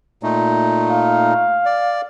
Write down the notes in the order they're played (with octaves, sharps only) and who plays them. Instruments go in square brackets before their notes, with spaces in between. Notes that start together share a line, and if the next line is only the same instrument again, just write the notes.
[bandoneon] A#2 A3 D#4
[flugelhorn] F5
[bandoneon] D5